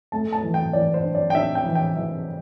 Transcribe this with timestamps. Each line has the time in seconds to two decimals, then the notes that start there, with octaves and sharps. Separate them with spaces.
0.12 A3 A5
0.32 A5
0.43 E3
0.54 G5
0.73 E3 D5
0.94 C5
1.04 D4
1.15 D5
1.30 G5
1.35 D4 E5
1.55 G5
1.65 E3
1.75 G5
1.96 E3 E5